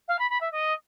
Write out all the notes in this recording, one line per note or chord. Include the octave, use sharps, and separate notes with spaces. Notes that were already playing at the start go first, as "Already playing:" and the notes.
F5
B5
B5
E5
D#5